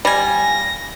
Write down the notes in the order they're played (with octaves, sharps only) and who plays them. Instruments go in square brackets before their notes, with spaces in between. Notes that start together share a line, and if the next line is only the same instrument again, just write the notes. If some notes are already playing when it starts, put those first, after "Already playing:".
[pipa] G3 [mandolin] F4 G#5 [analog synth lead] A#6